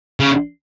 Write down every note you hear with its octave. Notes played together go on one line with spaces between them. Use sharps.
C#3